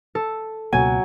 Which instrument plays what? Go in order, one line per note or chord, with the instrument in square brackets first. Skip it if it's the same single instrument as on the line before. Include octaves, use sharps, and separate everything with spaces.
[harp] A4
[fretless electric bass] C#2 B2 A#3 [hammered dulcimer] F#3 [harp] G#5